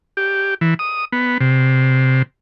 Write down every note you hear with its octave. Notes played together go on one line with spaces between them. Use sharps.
G4
E3
D#6
B3
C3